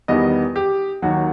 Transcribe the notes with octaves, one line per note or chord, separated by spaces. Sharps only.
E2 D#3 G3 B3 D#5
G4
D#2 D#3 F#3 F#4